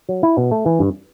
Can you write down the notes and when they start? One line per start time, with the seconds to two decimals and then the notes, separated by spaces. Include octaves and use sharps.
0.09 F#3
0.23 E4
0.37 B2
0.51 A3
0.66 E3
0.79 G2